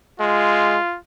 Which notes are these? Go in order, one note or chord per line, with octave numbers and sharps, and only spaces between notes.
G#3 F4